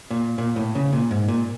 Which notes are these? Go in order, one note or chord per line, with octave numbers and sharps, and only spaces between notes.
A#2
A#2
A2
C#3
A#2
G#2
A#2